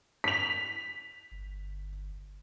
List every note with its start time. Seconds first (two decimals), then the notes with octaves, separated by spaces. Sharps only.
0.24 B6 F7
1.32 G1